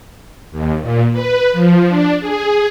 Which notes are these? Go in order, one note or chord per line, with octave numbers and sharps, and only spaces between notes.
D#2
A#2
B4
F3
D4
G#4